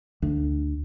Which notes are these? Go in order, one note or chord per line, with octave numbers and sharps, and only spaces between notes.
D2